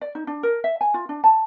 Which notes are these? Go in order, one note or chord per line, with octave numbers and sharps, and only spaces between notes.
D5
D#4
D4
A#4
E5
G#5
F4
D4
A5